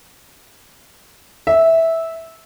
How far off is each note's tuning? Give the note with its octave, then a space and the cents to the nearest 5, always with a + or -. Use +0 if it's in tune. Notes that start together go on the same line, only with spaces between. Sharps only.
E5 -10